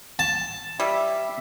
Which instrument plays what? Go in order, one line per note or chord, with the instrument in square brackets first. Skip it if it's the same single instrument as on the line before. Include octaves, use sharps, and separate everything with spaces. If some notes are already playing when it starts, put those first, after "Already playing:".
[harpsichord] A5
[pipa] G3 [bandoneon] E5